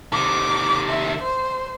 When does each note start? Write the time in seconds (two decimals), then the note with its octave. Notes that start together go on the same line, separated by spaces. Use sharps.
0.13 C3 D#3 D6
0.90 E5
1.22 C5